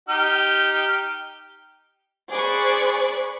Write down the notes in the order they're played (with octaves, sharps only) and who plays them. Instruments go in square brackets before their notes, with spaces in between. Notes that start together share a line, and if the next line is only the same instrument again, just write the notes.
[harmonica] D#4 G4 F6
[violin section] G#4 C5 D5 B5 C#6 F#6